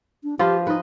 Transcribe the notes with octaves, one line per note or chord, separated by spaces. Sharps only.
D4
F3 F4 G4 B4
D#4 B4 D#5